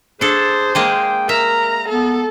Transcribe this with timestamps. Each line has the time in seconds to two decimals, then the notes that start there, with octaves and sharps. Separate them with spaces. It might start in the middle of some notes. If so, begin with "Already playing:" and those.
0.21 D4 G#4 A4 C5
0.75 G#3 A#3 G#4 G5
1.29 A#4 E5 A#5
1.89 B3 A4